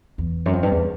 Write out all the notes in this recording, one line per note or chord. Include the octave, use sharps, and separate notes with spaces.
E2
F#2
F2
G2
E2